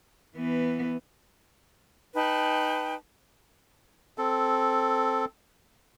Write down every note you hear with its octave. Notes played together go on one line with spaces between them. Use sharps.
E3 B3
D#4 B4 G5 A5
C4 A4